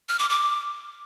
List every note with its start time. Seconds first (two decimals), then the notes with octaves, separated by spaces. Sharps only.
0.09 F6
0.19 D6
0.29 D6